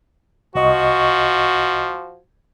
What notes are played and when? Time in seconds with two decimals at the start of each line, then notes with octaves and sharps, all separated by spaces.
0.55 C2 F3 F#4 D#5 C#6